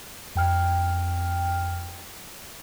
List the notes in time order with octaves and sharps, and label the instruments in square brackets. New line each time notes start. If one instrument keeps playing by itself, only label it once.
[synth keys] F2 G5 F6